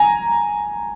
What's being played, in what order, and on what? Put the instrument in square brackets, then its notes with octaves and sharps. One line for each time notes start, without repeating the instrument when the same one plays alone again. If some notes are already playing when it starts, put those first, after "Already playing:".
Already playing: [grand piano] G#5 A#5